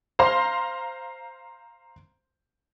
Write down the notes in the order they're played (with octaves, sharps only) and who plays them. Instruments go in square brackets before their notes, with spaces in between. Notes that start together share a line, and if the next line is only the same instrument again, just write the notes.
[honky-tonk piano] C5 F5 A#5 C6